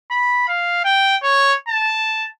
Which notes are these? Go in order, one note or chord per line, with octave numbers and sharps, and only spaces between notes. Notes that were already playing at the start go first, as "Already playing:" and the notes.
B5
F5
G5
C#5
A5